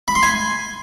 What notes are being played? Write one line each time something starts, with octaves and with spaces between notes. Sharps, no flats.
B5
C6
G#5